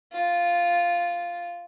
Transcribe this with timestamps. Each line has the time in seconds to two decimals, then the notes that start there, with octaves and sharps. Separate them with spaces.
0.13 F4